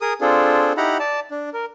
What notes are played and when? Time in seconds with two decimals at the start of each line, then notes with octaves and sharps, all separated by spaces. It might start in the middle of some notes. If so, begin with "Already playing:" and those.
0.01 G#4 A#4 D#6
0.21 C4 D4 F4 G#4 A4
0.77 D#4 E4 G4 F#5 A#5 B5
0.99 D5 A5
1.31 D4
1.53 A#4